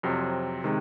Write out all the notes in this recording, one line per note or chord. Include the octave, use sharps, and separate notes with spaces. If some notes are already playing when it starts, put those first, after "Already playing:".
F2 C3 F#3 C4
C3 D#3 G#3